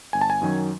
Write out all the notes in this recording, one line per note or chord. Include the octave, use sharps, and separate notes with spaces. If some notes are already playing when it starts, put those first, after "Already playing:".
G1 G#5
A5
G#5
F#2 D#3 F#3